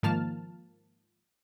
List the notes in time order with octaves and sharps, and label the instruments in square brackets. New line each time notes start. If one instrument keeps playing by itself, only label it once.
[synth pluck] G#2 D#3 F3 A#3 A5 F6